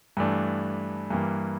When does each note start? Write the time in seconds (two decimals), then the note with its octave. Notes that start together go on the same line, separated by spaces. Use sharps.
0.17 G2 E3 A3 D4
1.11 G2 E3 G3 A#3